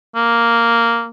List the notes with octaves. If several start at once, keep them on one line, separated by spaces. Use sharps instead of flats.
A#3